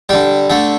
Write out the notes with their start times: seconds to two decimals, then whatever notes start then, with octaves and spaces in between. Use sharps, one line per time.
0.09 D3 G3 G5
0.50 D3 A3 G5